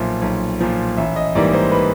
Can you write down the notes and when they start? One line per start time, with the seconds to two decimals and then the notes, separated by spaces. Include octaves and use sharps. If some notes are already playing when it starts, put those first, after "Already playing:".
Already playing: B1 A#2 F3 E5
0.22 B1
0.60 A#2 F3
0.97 A1 E5
1.16 D#5
1.35 G#2 E3 G3 A#3 D5
1.53 C5
1.72 B4